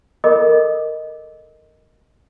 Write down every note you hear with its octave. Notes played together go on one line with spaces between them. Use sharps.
A4 A#4 D#5 D6